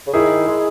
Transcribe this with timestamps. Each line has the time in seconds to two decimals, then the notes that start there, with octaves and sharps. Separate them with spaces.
0.07 C#3
0.13 D#3 E4 G#4
0.48 G#3